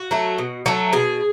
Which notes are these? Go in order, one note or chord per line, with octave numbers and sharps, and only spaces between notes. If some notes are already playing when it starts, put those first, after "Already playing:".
Already playing: F#4
F#3 A3
B2
F#3 A3
B2 G#4